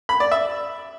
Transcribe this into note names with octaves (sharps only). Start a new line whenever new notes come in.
B5
D5
E5